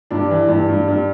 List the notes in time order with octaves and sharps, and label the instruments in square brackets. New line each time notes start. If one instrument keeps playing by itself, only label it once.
[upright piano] G2 D4
E3
G2
G2
G2